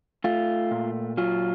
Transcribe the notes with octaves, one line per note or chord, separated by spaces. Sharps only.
A3 F4
A#2
F#3 F4